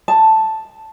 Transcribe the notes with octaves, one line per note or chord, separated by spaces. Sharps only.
A5